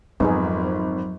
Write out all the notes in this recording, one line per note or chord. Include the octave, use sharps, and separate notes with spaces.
G#1 F2 F#3 B3 D#4 G#4